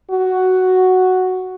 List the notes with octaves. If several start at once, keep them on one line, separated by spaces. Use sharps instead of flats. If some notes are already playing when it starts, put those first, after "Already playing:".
F#4